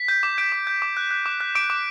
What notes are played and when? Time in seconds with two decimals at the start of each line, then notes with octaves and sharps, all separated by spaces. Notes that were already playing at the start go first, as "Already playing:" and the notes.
Already playing: B6
0.08 G6
0.23 D6
0.38 G6 D7
0.52 D6
0.67 G6
0.82 D6
0.97 F#6
1.11 F#6
1.26 D6
1.40 F#6
1.55 D6 D7
1.70 D6